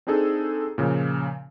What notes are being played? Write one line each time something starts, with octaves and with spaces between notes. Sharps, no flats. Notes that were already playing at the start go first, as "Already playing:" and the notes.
C4 D4 D#4 G#4 A4
A#2 C#3 F3